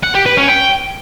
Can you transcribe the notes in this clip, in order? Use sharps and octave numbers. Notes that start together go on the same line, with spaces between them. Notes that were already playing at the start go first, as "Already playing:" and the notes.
F#5
G4
B4
C#4
G5